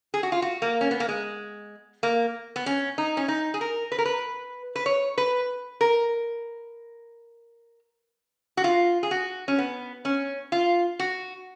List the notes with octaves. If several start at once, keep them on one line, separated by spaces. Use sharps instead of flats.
G#4
F#4
F4
F#4
A#3
C#4
B3
A#3
G#3
A#3
B3
C#4
D#4
C#4
D#4
G#4
A#4
B4
A#4
B4
B4
C#5
B4
A#4
F#4
F4
G#4
F#4
C#4
B3
C#4
F4
F#4